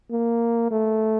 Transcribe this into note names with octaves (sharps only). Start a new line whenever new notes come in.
A#3
A3